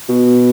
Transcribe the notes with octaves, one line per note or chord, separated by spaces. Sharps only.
B2